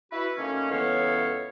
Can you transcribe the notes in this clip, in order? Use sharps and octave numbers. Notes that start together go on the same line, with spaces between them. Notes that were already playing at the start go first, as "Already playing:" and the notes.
E4 F#4 B4
D#3 A3 A#3 C#4
C#2 E3 B3 A4 C#5 F5